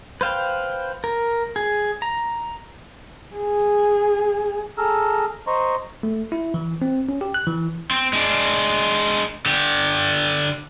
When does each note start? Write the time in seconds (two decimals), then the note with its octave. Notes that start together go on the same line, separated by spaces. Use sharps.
0.21 B4 C5 F5 G5
1.04 A#4
1.56 G#4
2.02 A#5
3.36 G#4
4.78 G#4 A4 A#5 E6 F6
5.47 C5 D#5 A#5 C6 C#6
6.03 A3
6.32 E4
6.54 E3
6.82 C4
7.09 C#4
7.21 G4
7.34 F#6
7.47 E3
7.91 C4
8.13 G#3 D4
9.46 D3 G4